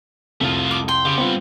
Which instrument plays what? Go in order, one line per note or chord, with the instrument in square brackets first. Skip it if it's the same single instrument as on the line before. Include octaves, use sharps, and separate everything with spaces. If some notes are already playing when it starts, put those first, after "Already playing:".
[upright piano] C2 F2 [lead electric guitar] A3 F4
[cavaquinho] D6
[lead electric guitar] G5 [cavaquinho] C6
[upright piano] C#3 [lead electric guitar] B3 G4
[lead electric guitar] G2 B3 [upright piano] C4 F4